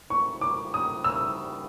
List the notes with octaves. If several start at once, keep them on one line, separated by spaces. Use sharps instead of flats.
C#6
D6
D#6
E6